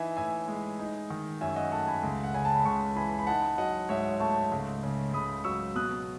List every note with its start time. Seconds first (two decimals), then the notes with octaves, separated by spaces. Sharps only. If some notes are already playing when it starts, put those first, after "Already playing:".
Already playing: E3 D#4 E5 G#5
0.17 A2 E5 G#5
0.48 G#3
0.79 D#4
1.10 D#3
1.41 F#2 E5 G#5
1.56 D#5 F#5
1.72 A3 F#5 A5
1.87 G#5 B5
2.03 C#2
2.24 F#5
2.34 C#3 G#5
2.45 A5
2.55 B5
2.65 C#2 A5 C#6
2.96 E3 G#5 B5
3.19 B5
3.27 D#4 F#5 A5
3.58 F#3 D#5 F#5
3.89 G#2 C#5 E5
4.20 A3 A5 C#6
4.52 C#2
4.83 C#3
5.13 C#2 B5 D#6
5.44 F#3 C#6 E6
5.75 B2 D#6 F#6